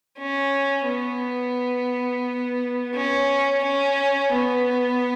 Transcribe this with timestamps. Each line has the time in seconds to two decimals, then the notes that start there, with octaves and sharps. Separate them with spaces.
0.18 C#4
0.87 B3
2.94 C#4
3.63 C#4
4.32 B3